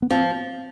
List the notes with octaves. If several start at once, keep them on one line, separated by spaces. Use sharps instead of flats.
B3
F3 C4